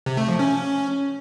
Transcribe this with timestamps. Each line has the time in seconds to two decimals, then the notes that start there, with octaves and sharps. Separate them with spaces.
0.06 C3
0.17 A3
0.28 F3
0.39 C#4